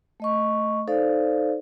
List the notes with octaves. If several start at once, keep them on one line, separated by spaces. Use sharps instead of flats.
A3 D#5 C#6
D#4 A4 C5 D5 F5